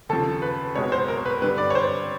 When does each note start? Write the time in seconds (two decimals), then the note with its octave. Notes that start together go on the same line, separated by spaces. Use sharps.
0.09 D#2 C#3 F3 A4
0.42 B4
0.75 B1 B2 G#3 C4 C#5
0.92 C5
1.08 A#4
1.25 B4
1.42 G2 D3 G3 B4
1.58 D5
1.70 C#5
1.75 C5